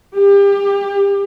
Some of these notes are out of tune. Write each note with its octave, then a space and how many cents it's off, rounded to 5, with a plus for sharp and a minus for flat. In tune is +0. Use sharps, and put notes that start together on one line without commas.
G4 +30